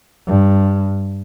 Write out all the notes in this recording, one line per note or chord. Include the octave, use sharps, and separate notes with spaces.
G2